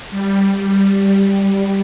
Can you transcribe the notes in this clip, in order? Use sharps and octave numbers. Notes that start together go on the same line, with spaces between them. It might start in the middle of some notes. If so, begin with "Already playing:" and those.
G3